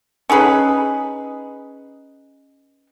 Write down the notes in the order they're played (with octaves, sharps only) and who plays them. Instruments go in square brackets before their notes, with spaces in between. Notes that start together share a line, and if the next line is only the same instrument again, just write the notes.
[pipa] C#4 D#4 G#4 B4